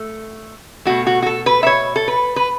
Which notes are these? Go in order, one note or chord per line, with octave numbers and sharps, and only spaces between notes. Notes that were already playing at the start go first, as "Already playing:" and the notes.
Already playing: A3
B2 A3 F#4
F#4
F#4
A4
B4
E5
C#5
A4
B4
B4